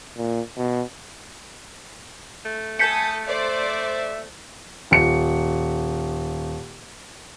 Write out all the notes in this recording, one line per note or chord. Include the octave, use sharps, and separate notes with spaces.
A#2
B2
A3
A4 G#5 D#6 G6 B6 C#7
C5 D5 E5
D#1 C#7